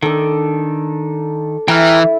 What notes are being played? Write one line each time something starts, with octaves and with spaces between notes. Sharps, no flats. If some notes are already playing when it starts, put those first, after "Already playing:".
D#3 D4 A4
E3 E4 G5 A#5 F6